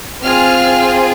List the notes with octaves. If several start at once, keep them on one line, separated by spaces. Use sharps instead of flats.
C4 F4 G#4 F6